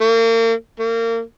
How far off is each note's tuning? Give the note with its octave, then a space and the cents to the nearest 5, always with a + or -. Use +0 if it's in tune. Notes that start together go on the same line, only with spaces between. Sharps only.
A#3 -40
A#3 -30